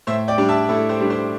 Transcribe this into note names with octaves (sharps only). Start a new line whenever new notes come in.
A2 C5 E5
D5 G5
G3 D4
E5 A5
A2 E4 A4
G4 C5
G3 D4
G4 C5